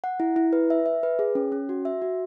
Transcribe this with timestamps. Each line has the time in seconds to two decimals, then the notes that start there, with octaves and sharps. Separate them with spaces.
0.04 F#5
0.20 E4
0.36 E4
0.53 B4
0.70 E5
0.86 E5
1.03 B4
1.19 G#4
1.35 C#4
1.52 C#4
1.69 F#4
1.85 E5
2.02 F#4